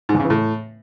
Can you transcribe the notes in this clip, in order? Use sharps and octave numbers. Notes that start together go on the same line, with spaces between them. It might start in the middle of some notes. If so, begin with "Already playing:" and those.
G#2
E2
C#3
E3
A2